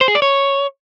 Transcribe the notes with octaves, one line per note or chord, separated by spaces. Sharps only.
C5
G#4
D5
C#5